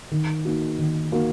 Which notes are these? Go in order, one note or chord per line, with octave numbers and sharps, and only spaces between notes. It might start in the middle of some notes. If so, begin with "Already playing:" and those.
D#3
A#3 D#4 F#4
D#3
A#3 D#4 F#4